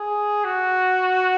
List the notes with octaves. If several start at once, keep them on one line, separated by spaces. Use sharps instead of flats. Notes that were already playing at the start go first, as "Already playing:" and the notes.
Already playing: G#4
F#4